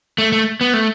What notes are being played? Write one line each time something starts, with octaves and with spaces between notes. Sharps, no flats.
A3
A3
B3
A3